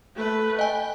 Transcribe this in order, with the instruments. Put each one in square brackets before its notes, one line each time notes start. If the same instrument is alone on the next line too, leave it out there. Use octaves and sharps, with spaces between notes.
[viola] A3 B4
[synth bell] D#5 G#5 [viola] G5